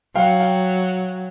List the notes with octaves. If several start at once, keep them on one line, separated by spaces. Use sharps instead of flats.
F#3 F5 G5
F5 G5